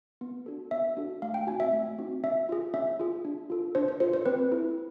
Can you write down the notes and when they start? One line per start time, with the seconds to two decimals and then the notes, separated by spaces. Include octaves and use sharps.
0.21 B3
0.46 D4 F#4 A4
0.71 B3 E5
0.97 D4 F#4 A4
1.22 A3 F5
1.34 G5
1.47 C4 D#4 F#4 G#5
1.60 E5
1.73 A3
1.98 C4 D#4 F#4
2.24 C#4 E5
2.49 F4 G#4
2.74 C#4 E5
2.99 F4 G#4
3.25 D4
3.50 F4 A4
3.75 D4 C5
3.88 C5
4.00 F4 A4 C5
4.13 C5
4.26 C4 B4
4.51 E4 A4